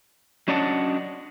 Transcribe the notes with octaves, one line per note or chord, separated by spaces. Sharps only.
F#3 C#4 D4 D#5 F#5 A5